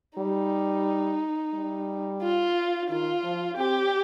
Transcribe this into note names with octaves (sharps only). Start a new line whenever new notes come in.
G3 D#4
G3
F4
D#3 F4
F3
C4 G4